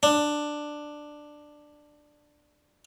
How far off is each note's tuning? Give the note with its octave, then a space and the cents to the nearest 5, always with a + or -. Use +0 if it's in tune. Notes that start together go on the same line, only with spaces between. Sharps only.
D4 +10